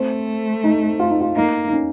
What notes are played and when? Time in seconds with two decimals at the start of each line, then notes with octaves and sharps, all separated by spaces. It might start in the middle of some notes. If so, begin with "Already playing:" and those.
Already playing: A3 C4
0.64 D#4
0.99 F4
1.10 D#4
1.21 F4
1.36 A#3 D#4
1.68 D#4
1.72 C#4